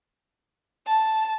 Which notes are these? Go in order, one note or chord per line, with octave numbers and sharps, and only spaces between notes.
A5